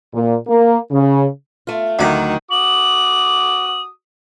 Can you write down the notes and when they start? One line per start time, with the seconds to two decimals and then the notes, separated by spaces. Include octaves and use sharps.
0.14 A#2
0.48 A#3
0.91 C#3
1.67 A3 F4
1.99 D2 D#3 F#3 D5
2.51 F#4 D6 D#6 F#7